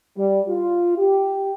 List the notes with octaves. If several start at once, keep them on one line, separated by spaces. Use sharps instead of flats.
G3
F4
G4